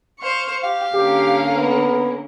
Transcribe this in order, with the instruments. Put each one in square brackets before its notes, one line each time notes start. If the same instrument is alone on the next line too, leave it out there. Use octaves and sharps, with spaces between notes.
[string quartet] C5 F5 C#6
[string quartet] G4 [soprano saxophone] F5
[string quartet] D3 A#3 C#4 [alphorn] G4
[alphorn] B3